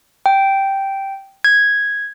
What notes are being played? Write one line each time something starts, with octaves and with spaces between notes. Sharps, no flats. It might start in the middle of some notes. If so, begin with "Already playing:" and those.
G5
G#6